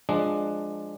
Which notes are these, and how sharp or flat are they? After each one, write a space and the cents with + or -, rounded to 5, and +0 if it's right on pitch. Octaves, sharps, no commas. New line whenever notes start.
F3 +15 G#3 +0 D4 +15